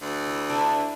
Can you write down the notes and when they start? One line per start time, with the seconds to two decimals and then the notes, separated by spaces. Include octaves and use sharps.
0.02 D2
0.27 E4
0.49 D4 E4